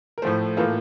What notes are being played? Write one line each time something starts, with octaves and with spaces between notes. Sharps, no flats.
A#4
A2 F3 A3 C5
A2 E3 A#3 F4 A4